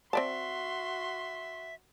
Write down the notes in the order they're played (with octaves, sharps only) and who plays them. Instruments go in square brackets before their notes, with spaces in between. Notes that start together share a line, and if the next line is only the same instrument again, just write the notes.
[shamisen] C4 D5 A5 [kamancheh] F#4 C6 [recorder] E5